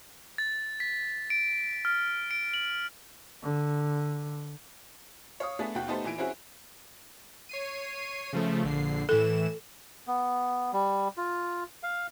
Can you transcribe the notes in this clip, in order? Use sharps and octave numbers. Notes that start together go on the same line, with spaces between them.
A6
B6
D7
F6
D7
F#7
D3
C#5 F5 D#6
A3 B3 D4 G#4 A4
D#2 B2 F#4 G5
A3 B3 D#4 G4 A4 C5
A#2 E3 G#5 D7
C4 C#4 E4 F#4 G#4
C#5 C7 D#7
C#3 F3 A3
A#1 D3 C7
A2 E3 A4 E7
B3
G3
F4
F5